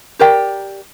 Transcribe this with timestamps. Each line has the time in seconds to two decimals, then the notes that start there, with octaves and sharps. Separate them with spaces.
0.19 G4 A#4 D5 G5